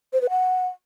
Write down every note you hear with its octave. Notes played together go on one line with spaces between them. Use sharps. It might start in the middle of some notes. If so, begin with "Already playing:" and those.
C5
B4
F#5